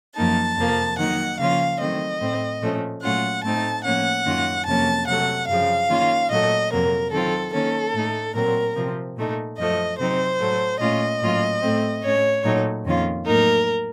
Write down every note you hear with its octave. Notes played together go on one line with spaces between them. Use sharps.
F#2 F3 A#3 D#4 A5
F2 C3 F3 A#3
D#3 F#3 A#3 D#4 F#5
C#3 F3 A#3 C#4 F4 F5
D#3 F#3 A3 C4 D#5
A2 A3 C4
A#2 F3 A3 C#4
A#2 F#3 A3 C#4 F4 F#5
A2 A3 C4 D#4 A5
A2 F3 A#3 C#4 F#5
F#2 D#3 A#3 C#4 F4
F2 C3 F#3 A#3 C#4 A5
C3 F#3 A3 F#5
F#2 C#3 F3 F5
D#3 A#3 C#4 F4
A#2 F#3 A3 D#5
F2 C3 F#3 A#3 A#4
D#3 F#3 C4 F4 A4
D#3 A#3 C#4 A4
A2 A3 D#4
A#2 F#3 C4 A#4
C3 F3 C4
A#2 A3 D#4
F#2 F3 A3 D#5
C3 F#3 C4 D#4 C5
A2 F#3 A3
A#2 A3 C#4 F4 D#5
A2 F#3 A#3 C#4 F4
A2 A3 C4
A2 A3 C#4 C#5
A#2 F#3 A3 D#4
F2 D#3 A#3 C#4 F4
A2 F#3 A#3 D#4 A#4